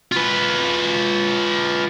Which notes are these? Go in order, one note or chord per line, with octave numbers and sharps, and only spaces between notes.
F4 B4